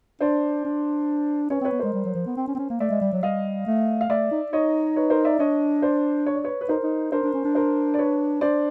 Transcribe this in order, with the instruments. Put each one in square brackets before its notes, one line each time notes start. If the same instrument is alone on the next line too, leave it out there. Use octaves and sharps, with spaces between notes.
[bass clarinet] D4 [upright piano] C5 D5
[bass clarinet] D4
[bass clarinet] C#4 [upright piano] B4 C#5
[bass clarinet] C4 [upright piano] B4 C#5
[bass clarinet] B3
[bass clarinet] G#3 [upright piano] A#4 C5
[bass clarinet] G3
F#3
F3
B3
C4
C#4
C4
C#4
A#3
[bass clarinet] A3 [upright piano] D5 E5
[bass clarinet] G#3
G3
F#3
[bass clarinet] G3 [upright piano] D#5 F5
[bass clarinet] A3
[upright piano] F5
[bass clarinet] A3 [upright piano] D5 E5
[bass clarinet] D#4
[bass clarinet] D#4 [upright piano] C#5 D#5
[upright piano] B4 C#5
A#4 C5
D5 E5
[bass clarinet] D4 [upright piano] C#5 D#5
[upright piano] C5 D5
C#5
D5
B4 C#5
B4
[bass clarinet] D#4 [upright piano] A#4 C5
[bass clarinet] D#4
[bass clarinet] D4 [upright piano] A#4 C5
[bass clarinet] D4
C#4
D4
[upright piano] A#4 C5
D5
B4 C#5
[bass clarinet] D4 [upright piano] C5 D5